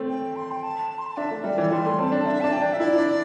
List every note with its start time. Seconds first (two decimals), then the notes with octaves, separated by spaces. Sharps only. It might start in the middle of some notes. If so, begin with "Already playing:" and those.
Already playing: A3 C4
0.08 G5
0.36 C6
0.51 G5
0.63 A5
0.90 A5
0.99 C6
1.06 A5
1.17 D4 E5
1.31 A3
1.44 G3 D5
1.58 E3
1.72 G3 C6
1.86 A3
1.99 C4 A5
2.12 D4
2.25 D4 E5
2.41 D4 A5
2.53 G5
2.62 D4
2.73 E5
2.80 E4 D5
2.98 D4